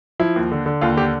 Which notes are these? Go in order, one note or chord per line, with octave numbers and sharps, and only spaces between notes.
F3 E4
D#2
D3
D3
D#2 F4
D3 G4